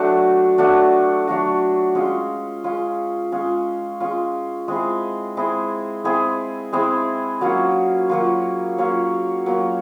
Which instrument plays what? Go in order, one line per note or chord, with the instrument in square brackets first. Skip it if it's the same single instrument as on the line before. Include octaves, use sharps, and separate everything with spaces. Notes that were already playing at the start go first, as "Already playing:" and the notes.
Already playing: [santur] F#3 A3 D4 F#4
F#3 A3 D4 F#4
F#3 A3 D4 F#4
G#3 C#4 F4
G#3 C#4 F4
G#3 C#4 F4
G#3 C#4 F4
G#3 C4 E4 G#4
G#3 C4 E4 G#4
G#3 C4 E4 G#4
G#3 C4 E4 G#4
F#3 A#3 C#4 F4
F#3 A#3 C#4 F4
F#3 A#3 C#4 F4
F#3 A#3 C#4 F4